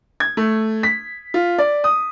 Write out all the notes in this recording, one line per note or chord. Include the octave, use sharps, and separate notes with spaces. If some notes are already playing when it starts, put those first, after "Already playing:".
G#6
A3
B6
F4
D5
D#6